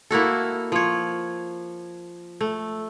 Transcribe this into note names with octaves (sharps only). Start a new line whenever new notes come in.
A#3 E4 F#4 A4
F3 C#5
A3